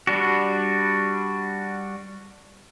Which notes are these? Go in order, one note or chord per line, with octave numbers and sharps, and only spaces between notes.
G3 D4 F#4